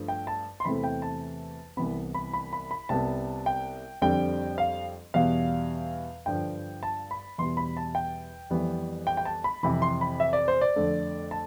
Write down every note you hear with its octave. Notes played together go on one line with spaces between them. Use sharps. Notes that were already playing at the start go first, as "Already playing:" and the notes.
Already playing: G2 F3 A3
G5
A5
C6
E2 C3 E3 A3 C4 B5
G5
A5
C2 C3 E3 B3 B5
B5
B5
B5
B5
C2 C3 G3 B3 A5
G5
F2 D3 G3 C4 G5
F5
E2 B2 G3 F5
G2 D3 F3 G5
A5
B5
E2 B2 G3 C6
B5
A5
G5
F2 E3 G3 B3
G5
G5
A5
B5
F2 C3 E3 B5
C6
B5
E5
D5
C5
D5
F2 D3 A3
A5